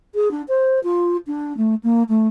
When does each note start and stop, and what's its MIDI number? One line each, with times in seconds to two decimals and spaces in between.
0.14 0.31 68
0.31 0.42 62
0.48 0.79 72
0.83 1.17 65
1.27 1.56 62
1.57 1.75 57
1.83 2.03 58
2.08 2.27 57